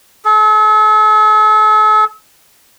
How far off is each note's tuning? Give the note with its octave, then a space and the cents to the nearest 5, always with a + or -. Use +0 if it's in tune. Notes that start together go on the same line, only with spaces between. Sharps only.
A4 -40